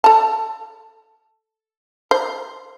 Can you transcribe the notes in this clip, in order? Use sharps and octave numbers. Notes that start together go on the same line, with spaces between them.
A4 A5
C5